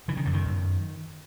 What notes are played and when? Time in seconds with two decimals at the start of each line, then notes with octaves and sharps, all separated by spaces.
0.08 C#3 E3
0.17 D#3
0.25 F#2 D3
0.33 D#3
0.45 F#2